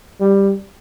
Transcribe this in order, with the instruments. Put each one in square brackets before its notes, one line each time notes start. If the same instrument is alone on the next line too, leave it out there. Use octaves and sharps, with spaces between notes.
[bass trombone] G3